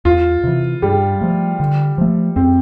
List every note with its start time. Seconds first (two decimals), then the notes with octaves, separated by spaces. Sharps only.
0.05 E2 F4
0.44 C3 E3
0.82 G2 G3
1.21 F3 A3
1.60 D3
1.98 F3 A3
2.36 F2 C4